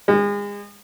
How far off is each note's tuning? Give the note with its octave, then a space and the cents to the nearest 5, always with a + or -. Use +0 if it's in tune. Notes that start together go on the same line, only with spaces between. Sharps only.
G#3 -35